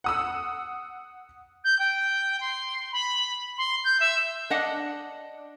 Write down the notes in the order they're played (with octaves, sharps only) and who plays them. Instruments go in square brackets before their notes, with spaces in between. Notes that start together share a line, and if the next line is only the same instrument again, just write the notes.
[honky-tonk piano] F#5 D#6 E6
[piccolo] G6
G5
C6
B5
C6
G6
E5
[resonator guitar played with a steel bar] D4 D#5 F#5